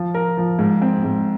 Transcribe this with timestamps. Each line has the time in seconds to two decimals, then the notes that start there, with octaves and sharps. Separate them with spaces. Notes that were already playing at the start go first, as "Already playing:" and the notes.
Already playing: F3
0.14 A#4
0.37 F3
0.59 G#2
0.82 C4
1.04 G#2